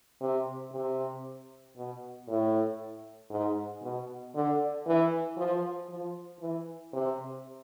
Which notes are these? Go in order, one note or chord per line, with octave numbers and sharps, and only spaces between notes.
C3
C3
B2
A2
G#2
B2
D3
E3
F3
F3
E3
C3